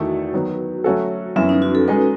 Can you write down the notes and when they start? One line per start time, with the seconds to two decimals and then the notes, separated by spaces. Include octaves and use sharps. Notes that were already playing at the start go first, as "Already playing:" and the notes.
Already playing: E2 D#3 A3 E4 F#4 A4
0.34 D#3 F#3 B3
0.84 F#3 A3 C#4 F#4 A4
1.36 F#2 E3 B3 C#4 E4
1.49 D#4
1.62 F#4
1.75 A4
1.88 G#3 D#4 G#4 B4 D#5